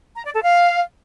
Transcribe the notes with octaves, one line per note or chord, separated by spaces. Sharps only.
A#5
D5
A4
F5